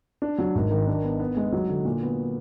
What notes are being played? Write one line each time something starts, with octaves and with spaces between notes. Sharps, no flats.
D4
F#3
G#1
D#3
D4
B3
B3
G#3
F#3
D3
A#2
B3